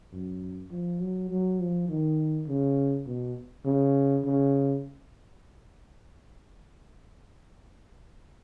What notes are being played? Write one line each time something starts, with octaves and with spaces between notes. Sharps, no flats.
F#2
F3
F#3
F#3
F3
D#3
C#3
B2
C#3
C#3